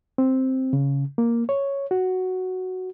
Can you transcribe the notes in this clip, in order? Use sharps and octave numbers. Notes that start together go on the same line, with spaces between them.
C4
C#3
A#3
C#5
F#4